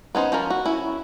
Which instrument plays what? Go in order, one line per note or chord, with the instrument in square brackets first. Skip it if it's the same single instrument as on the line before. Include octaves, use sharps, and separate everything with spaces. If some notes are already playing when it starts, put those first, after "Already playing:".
[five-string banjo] B3 C#4 D#4 C5
F3 C#4 F4 A#4
F#4
C#4 E4